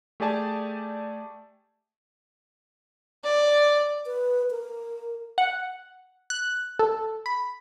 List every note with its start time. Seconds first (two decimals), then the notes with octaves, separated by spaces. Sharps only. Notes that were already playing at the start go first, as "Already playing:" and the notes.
0.20 A3 G4 G#4 D5 G#5 A5
3.24 D5
4.06 B4
4.51 A#4
5.38 F#5
6.30 F#6
6.79 A4
7.26 B5